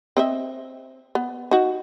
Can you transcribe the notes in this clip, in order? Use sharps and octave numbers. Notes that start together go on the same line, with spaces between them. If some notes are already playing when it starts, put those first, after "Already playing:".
C4 D#5 E5
B3
D#4 F#4